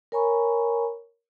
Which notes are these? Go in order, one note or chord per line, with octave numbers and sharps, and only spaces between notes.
A#4 C#5 G#5 A#5 B5 C#6